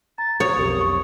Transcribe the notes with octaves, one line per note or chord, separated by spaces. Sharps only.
A#5 A6
C#5 D#6
B1 F2 G4 A#4
C#6